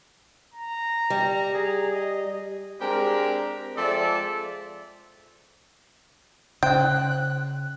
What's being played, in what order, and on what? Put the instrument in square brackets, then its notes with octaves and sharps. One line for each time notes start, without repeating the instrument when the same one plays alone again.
[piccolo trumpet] A#5
[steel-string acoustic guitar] G3
[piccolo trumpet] G#4
D#5
[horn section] G#3 C4 D4 G4 A#4
F3 G#3 C4 A4 D5 E5
[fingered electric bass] C#3 [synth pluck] C5 [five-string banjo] G5 [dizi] F#6